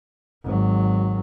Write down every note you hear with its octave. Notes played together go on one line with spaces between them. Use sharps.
G#1 F#3